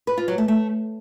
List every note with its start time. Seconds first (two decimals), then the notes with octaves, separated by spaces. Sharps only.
0.07 B4
0.18 F4
0.28 F#3
0.38 A3
0.48 A3